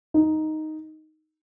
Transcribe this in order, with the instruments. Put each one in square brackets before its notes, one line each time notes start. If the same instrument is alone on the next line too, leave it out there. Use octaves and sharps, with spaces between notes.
[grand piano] D#4